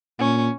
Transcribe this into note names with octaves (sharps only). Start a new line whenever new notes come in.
A#2 C#4